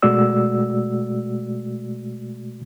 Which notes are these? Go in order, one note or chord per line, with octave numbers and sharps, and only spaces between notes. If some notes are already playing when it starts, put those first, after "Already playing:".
B2 G#3 A3 F#4 D5 E6